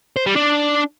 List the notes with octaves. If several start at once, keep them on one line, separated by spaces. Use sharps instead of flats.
C5
G3
D4